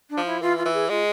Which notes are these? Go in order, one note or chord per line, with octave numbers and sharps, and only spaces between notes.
D4
F3
E4
E3 F4
F4
E3
G#4
G#3 F4